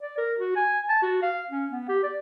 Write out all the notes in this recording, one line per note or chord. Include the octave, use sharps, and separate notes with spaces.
D5
A#4
F#4
G#5
A5
F#4
F5
C#4
B3
G4
D5